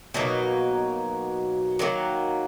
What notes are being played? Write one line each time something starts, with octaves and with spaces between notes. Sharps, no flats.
B2 F#3 A#3 D#4
D#3 F#3 A#3